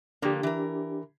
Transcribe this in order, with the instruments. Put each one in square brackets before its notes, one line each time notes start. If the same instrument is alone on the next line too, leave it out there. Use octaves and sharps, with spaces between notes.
[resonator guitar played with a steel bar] D3 F3 A#3 [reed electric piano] D4 G4
[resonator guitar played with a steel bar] E3 A#4